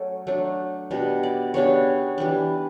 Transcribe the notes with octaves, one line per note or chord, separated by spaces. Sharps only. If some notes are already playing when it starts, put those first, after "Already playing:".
Already playing: F#3 A3 C#4 A4
F#3 A3 D4
B2 G3 D4
D5
C#3 G3 B3 D4 C#5
E3 G3 D4